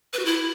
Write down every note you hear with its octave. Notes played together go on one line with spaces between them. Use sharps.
B4
F#4
E4